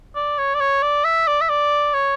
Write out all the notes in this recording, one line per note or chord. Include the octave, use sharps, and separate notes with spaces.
D5
C#5
D5
C#5
D5
E5
D5
E5
D5
C#5